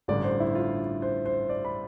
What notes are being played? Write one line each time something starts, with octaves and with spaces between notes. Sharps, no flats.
A1 G2 D3 D5
C5
E4
F4
C5
C5
D5
B5